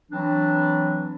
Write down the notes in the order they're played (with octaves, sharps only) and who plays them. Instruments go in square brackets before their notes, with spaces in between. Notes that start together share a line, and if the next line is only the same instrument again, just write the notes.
[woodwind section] E3 F#3 C4 D4